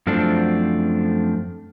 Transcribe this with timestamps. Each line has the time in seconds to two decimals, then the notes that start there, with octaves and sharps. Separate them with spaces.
0.07 F#2 F3 A3 C4 D4